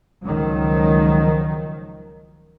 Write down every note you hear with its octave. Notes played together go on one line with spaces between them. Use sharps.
C#2 D#3 F3 F#3